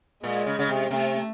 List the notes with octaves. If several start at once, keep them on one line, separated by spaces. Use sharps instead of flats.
A#2 G#3
C#3
C#3
C3
C3 A3